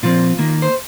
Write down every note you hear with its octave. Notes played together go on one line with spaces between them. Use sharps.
A#2 F3 C4 F4
D#3 A#3
C5